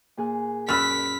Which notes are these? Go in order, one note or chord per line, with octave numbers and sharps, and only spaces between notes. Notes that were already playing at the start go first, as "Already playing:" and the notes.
A#2 G#4 F#6
F#2 B4 B5 E6 F6 B6